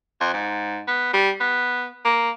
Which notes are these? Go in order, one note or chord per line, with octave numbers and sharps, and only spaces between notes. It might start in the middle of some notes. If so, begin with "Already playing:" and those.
F2
G#2
B3
G3
B3
A#3